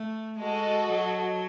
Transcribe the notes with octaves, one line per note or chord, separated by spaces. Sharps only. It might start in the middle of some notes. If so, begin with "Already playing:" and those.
Already playing: A3
G#3 F#4 A4 D#5
F#3